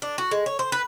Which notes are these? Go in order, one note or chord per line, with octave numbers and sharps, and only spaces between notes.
D4
F#4
G#3
C#5
C5
B4